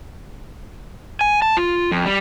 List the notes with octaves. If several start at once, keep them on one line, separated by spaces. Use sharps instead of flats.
G#5
A5
F4
F2
G3